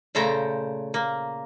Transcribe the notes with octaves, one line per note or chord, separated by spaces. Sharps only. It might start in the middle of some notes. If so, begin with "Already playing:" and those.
A#2 C#3 A3 C5 G5 A#5
A#3